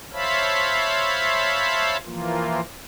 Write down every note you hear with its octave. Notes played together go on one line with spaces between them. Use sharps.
C5 C#5 E5 F5 A5 B5
E3 F3 A#3 F4